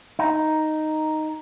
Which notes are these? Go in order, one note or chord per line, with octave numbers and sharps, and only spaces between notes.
D#4